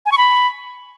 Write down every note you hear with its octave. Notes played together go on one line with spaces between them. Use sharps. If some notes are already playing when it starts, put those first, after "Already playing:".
G#5
C#6
B5